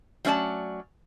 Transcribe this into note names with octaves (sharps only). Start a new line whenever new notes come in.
F#3 A3 C#4 C#5 D5 A5